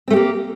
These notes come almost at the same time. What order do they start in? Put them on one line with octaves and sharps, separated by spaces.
C4 A3 G4 A#3